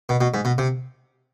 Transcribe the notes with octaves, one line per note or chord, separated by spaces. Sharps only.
B2
B2
G#2
B2
C3